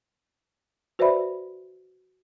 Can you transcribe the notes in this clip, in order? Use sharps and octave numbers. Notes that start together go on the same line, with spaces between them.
F#4 B4 C5 D5 E5 B5